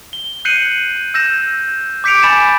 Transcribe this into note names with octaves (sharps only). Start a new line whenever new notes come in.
G7
F#6 G6 C7 C#7 D#7 F#7
E6 G6 A#6 E7
D6 G6 B6 C#7 D7 F7
G#5 B5 A6 B6 E7